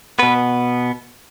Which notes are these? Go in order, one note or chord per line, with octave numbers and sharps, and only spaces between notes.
B2 B3 B4